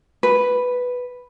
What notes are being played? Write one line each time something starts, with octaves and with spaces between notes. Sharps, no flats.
B4